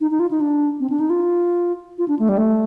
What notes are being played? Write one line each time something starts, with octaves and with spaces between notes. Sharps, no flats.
D#4
D#4
F4
D#4
D4
C4
D4
D#4
F4
F4
D4
A3
G3
A3